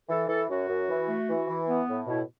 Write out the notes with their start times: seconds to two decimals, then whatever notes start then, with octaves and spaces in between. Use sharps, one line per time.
0.09 E3 A4
0.28 E3 A4
0.49 F#2 F#4
0.68 F#2
0.89 E3
1.08 A3
1.28 E3
1.48 E3
1.68 B3
1.88 A2
2.07 B2 E4